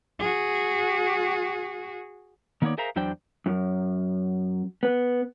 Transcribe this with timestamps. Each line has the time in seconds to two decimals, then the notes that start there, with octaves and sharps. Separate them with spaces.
0.19 F#4 G#4
2.62 D#3 A#3 B3 D#4 C#5 D5
2.78 G#4 A#4 C5 E5 F5 A#5
2.96 E2 F#3 D4 C5 D5 G5
3.46 F#2
4.83 B3